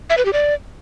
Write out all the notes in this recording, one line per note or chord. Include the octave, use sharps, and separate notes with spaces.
E5
B4
G4
D5